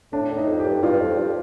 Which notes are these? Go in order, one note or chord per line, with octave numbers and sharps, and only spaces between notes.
A2 D4
A2
D#4
F2
G4
G2
G2 F4
G2
F2
G2